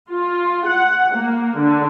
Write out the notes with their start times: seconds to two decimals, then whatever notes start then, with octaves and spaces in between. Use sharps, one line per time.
0.12 F4
0.68 F#5
1.16 A#3
1.58 D3